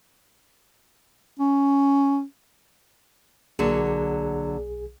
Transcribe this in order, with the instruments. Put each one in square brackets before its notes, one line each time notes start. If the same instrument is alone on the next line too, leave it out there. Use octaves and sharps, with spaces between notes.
[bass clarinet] C#4
[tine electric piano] B1 G#4 [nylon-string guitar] D3 F#3 A#3